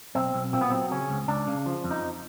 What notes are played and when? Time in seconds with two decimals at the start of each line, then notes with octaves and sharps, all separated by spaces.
0.15 B1 C4
0.34 B1
0.53 A#2 C4
0.61 B3
0.70 F#3 C4
0.91 C#3 C#4
1.10 C#2
1.28 C#2 D4
1.48 C#3
1.66 F3
1.84 F2
1.91 D#4